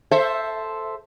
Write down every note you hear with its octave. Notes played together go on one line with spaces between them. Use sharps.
A4 C5 E5